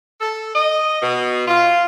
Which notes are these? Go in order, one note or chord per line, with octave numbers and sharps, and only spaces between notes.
A4
D#5
B2
F4